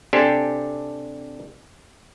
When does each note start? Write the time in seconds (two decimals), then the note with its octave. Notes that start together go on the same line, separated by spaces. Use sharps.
0.13 C3 D4 G4 A4 C5 G#5